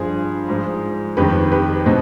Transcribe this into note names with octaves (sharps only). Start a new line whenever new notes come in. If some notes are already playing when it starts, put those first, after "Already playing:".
Already playing: G2 F3 G#4 C5
G#2 F3
F2 D#3 G4 B4
G4 B4
B2 C4 D#4